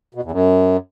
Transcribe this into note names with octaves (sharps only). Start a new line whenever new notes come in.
B2
E2
F#2